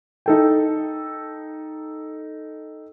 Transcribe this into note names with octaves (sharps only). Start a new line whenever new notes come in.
D#4 A4 G5